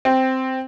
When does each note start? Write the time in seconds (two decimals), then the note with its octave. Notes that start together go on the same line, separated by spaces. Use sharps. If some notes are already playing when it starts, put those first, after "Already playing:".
0.05 C4